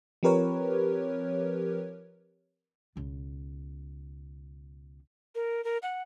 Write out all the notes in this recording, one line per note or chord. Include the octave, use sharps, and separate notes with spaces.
F3 C4 G4 A#4 B4 C#5
C#2 B2
A#4
A#4
F#5